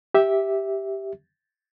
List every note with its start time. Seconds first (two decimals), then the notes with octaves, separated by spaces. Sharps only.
0.14 G4 E5